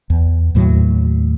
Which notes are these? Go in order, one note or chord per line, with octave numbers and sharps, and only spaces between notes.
E2
D#2 A2 F#3